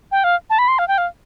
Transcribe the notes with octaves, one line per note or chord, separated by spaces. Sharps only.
G5
F5
A5
B5
C6
F5
G5
F5